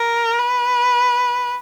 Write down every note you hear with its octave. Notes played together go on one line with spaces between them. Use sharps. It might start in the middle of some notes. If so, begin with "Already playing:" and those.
Already playing: A#4
B4